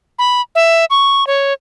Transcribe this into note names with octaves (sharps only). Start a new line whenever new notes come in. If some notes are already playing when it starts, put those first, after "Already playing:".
B5
E5
C#6
C#5